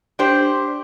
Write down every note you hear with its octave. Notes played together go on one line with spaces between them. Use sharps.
D4 G4 C5